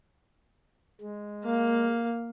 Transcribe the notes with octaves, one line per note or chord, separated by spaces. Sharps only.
G#3
A#3 F5